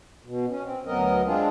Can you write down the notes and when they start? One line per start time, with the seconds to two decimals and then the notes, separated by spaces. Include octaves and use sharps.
0.25 B2
0.49 C#4
0.64 C4
0.86 D2 F#3 B3 A#4 D#5
1.25 G#3 C4 D4 F4 G#4